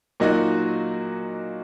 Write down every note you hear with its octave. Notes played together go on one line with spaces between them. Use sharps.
A#2 F#3 A#3 D#4 F#4